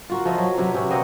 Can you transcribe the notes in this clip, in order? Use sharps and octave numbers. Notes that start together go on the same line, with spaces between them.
F4 F#4 A#4
F3 F4 D#5 E5
F#3
C3 F#3 B4
C3 C#4 F#4
A#3 C4 D#5 F#5